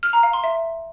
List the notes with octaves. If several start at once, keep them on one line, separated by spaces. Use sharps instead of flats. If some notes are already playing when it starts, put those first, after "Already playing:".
F6
A#5
F5
C6
E5